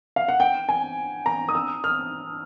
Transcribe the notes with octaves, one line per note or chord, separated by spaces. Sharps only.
F5
F#5
G5
G#5
A#5
D#6
E6
F6